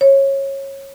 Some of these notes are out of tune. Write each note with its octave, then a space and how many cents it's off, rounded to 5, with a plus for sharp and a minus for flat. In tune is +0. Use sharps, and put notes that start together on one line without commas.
C#5 -20